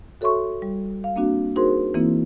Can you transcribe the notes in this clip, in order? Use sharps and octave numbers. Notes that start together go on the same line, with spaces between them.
F#4 A4 C#5 E5 C6 C#6
G3
F5
A#3 C4 D4 F#4
D#4 F#4 G#4 A#4 C5 C6
E3 A#3 C4 D#4 E4